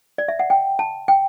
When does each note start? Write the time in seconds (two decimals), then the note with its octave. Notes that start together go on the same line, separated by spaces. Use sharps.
0.18 D5
0.28 E5
0.39 F#5
0.50 G5
0.79 A5
1.08 G5